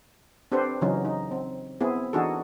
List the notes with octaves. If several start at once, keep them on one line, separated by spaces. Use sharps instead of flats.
C4 D4 G4 A4 B4 C5
C#3 E3 F#3 C#4 D#4
D#4
C4
B3 C4 E4 G#4
E3 D4 D#4 F#4 G#4 A4